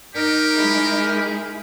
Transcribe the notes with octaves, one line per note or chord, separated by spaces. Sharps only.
D#4 G4 A#4
G#3 E4 G#4